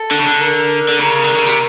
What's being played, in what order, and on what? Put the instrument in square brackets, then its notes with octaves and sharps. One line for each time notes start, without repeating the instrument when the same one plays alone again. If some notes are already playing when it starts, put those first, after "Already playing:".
Already playing: [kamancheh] A4
[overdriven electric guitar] D3
C#3
D3
[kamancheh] A#4
[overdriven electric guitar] D3
[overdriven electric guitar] C#3 [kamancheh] A#4
[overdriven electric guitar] D3
C#3
C3